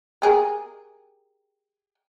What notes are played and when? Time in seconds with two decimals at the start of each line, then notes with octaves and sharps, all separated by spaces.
0.22 G4 G#4 A#4